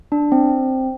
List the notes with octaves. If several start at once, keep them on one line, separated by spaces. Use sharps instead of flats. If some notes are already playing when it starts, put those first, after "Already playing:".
D4
C4